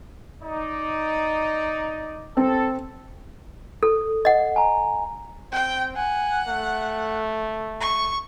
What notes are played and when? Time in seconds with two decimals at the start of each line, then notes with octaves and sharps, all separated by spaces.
0.42 D#4 D5
2.37 C4 A4
3.83 A4
4.25 D#5 F#5
4.56 G#5 A#5
5.52 C4 G5
5.96 F#5 G#5
6.48 A3
7.81 C#6